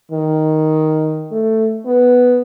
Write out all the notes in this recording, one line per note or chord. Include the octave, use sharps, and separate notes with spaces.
D#3
A3
B3